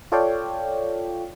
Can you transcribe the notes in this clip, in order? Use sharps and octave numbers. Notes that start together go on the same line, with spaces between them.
F4 A4 C#5 D5 F5 G5